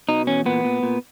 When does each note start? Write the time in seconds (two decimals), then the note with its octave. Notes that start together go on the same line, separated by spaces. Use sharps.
0.09 B2 D#4
0.27 E2 C#4
0.46 A#2 B3
0.64 A#2
0.83 A#2